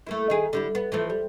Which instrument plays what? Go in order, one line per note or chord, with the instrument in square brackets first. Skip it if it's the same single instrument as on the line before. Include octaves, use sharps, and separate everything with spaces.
[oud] A3 A#3 E4
D#3 G#4
D3 G3 E4
B3
E3 F3 A3
G3